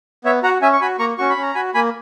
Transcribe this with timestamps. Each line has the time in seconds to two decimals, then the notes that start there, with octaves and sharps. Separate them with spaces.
0.24 B3 C#5 E5
0.43 F#4 F#5 A#5
0.62 C#4 E5 G#5
0.73 C#6
0.81 F#4 G#5 B5
0.99 A#3 A#5 C#6
1.18 C#4 F#4 C#6
1.30 B5
1.36 C#4
1.42 A#5
1.55 F#4 G#5 B5
1.74 A#3 G#5 B5